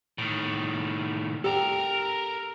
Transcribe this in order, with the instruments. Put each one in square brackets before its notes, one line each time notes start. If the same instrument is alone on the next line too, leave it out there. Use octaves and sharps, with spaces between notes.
[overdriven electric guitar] A2 D#3
[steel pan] G4 [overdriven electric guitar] A4 A#4